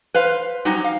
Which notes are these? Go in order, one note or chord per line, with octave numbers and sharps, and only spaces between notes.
B4 C5 F5
F#3 G3 C#4 D#4
F5